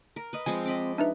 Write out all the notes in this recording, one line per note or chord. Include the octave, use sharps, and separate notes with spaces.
A#4
B4 D#5
F3 G#3 C4 G#5
C4 D#5 B5 D6
D4 D#4 B4 E5